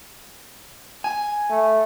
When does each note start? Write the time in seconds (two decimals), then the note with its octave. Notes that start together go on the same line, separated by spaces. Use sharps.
1.04 G#5
1.50 A3